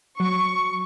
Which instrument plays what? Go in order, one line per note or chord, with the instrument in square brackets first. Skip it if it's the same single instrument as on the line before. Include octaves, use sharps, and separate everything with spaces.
[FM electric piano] F#3 [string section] C#6